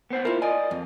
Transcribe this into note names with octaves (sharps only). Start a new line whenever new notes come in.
B3 C5 F#5
E4 F4 A#4
D5 D#5 G#5
F2